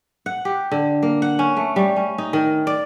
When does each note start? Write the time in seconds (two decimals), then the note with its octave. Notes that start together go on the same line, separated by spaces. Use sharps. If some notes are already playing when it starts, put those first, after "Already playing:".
0.26 F#5
0.45 G4
0.72 D3
1.03 A#3
1.22 F#5
1.39 C#4
1.57 A3
1.76 G3
1.96 C#4
2.18 D#4
2.33 D#3
2.67 D5